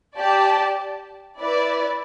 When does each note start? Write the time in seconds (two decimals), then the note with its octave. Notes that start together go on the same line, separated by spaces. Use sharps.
0.18 G4 D5 A5
1.41 E4 B4 D5